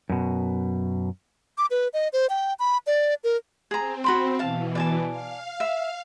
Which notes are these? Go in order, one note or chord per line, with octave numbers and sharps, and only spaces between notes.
F#2 B2
D6
B4
D#5
C5
G5
B5
D5
A#4
C4 G#4 A#5
F#4 B5 C6
B2 E3 F5 A5
D5 G#5 A5
F5
E5